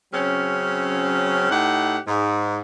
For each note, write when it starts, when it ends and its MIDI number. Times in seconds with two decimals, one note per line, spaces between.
0.13 1.48 49
0.13 1.48 54
0.13 1.48 60
0.13 1.48 61
1.51 1.98 45
1.51 1.98 63
1.51 1.98 67
1.51 1.98 78
2.07 2.60 44